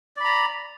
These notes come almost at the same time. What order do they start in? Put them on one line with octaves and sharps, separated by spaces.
D5 B5 A#5